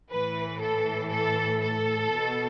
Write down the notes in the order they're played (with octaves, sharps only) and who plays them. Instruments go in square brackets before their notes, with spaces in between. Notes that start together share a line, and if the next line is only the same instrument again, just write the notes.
[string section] A2 E3 B4
A4
A4
A4
B2